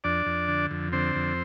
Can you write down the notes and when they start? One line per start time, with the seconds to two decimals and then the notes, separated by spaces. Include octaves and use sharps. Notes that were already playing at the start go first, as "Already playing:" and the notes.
0.04 F2 D4 D5
0.26 F2
0.48 D3
0.71 F2
0.92 D3 C4 C5
1.15 F2